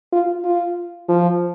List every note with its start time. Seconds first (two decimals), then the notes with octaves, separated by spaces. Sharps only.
0.13 F4
0.45 F4
1.09 F3